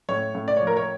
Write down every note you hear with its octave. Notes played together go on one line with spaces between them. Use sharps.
A2 C#5
A2
D5
F3 C#5
A#4
C#5